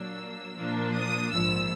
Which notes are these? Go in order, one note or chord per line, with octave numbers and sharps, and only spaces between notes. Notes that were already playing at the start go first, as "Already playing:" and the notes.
Already playing: A#2 F#3 A#3 D4 E6
A#2 F3 A#3 D4
D#6
A#1 G#2 F3 E6